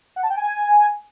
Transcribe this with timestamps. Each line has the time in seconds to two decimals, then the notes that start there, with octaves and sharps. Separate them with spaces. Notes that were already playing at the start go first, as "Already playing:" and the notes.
0.16 F#5
0.23 A5
0.30 G5
0.37 G#5